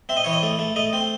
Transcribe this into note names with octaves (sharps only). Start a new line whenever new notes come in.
C4 E5
D#5
E3 C#5
D#5
A3
A3
A3 D#5
C4